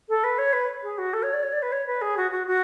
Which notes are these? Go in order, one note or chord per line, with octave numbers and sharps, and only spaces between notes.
A4
B4
C#5
B4
G#4
F#4
A4
C#5
D5
C#5
D5
B4
C#5
B4
G#4
F#4
F#4
F#4